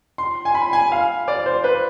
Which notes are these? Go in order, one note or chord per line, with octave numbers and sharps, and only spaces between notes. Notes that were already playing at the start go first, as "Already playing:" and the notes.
C6
G#5
B5
G#5
F5
D5
C5
B4